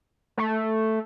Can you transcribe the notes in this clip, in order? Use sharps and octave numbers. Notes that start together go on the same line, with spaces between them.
A3